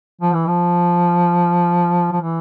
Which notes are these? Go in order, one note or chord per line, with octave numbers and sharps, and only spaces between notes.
F3
E3
F3
F3
E3